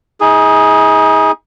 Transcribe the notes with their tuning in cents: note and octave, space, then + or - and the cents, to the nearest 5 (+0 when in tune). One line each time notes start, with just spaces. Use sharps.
D#4 +40 G#4 +0